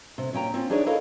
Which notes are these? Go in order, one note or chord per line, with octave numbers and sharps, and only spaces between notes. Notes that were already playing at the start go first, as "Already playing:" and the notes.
C3
A#2 C#4 G5 A#5
C4 C#4 F4
D4 D#4 G#4 C#5 D5 E5
E4 A4 A#4 C#5 D#5 F5